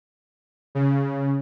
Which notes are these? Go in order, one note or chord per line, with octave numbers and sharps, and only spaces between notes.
C#3